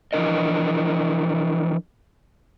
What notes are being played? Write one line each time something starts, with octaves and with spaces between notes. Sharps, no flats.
E3 F3 D4 A#4 D#5